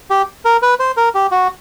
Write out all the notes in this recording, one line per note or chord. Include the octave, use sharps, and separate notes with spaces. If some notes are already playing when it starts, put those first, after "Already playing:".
G4
A#4
B4
C5
A#4
G4
F#4